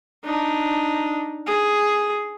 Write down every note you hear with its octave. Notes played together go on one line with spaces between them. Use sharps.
D4 D#4
G#4